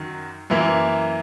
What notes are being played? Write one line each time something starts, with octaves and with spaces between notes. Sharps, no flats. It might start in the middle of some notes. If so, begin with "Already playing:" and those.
Already playing: F#2 D#3 F#3
F#2 E3 A#3 E4